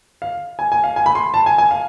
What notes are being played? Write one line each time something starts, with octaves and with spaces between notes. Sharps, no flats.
F5
G#5
G#5
F5
G#5
B5
C6
A5
G#5
G#5
F5